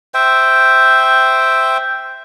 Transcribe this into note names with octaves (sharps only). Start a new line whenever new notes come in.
C5 E5 G5